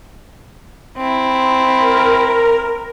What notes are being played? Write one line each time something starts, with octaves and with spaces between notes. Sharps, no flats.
C4 E4
A#4